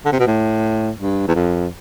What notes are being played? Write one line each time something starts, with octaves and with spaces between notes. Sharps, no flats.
D3
C3
B2
A2
G2
E2
F2